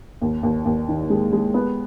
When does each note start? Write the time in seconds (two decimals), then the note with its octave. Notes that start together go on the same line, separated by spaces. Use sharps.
0.22 D#2
0.43 D#2
0.65 D#2
0.88 D#3
1.10 G#3
1.33 G#3
1.54 B3